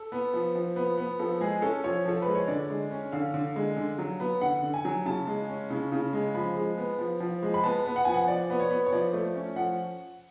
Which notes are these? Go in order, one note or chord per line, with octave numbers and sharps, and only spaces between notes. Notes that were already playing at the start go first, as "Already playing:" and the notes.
Already playing: A4
B3
F3
F3
B3
B3
F3 A4
G#3 G#4
C#4 A4
F3 C#5
F3 A4
G#3 B4
C#5
D3 D5
G#3
C#4
D3 F5
D3
G#3
D3
F#3
B3
D3 F#5
D3
G#5
F#3
C#3 A5
G#3
C#4
C#3
C#3
G#3
F3 B5
G#3
B3
F3
F3
G#3
B5
B3 A5
B3
F#5
F3 G#5
F#5
F3 D5
B3
C#5
B3
C#5
F3 D5
A3
C#4
F3 F#5